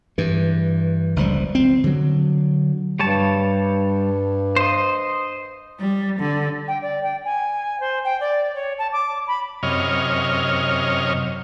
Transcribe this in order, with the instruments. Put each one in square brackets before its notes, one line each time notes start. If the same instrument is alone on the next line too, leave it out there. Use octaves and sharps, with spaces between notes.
[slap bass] G2 E3
F#1 C#2 F3 G3
C4
D3 F#3
[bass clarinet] G2 [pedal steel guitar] G3 C#5 A5
[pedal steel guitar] C5 D#5
[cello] G3
D3
[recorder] G5
D5
G5
G#5
C5
G5
D5
C#5
A5
D6
B5
[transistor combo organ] F#2 C3 C#5 D#5 F6